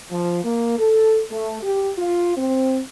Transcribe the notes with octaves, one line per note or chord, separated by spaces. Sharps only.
F3
A#3
A4
A3
G4
F4
C4